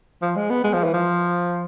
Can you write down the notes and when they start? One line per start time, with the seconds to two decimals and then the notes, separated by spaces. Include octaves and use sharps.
0.22 F3
0.36 G#3
0.50 B3
0.64 G#3
0.73 F3
0.84 E3
0.94 F3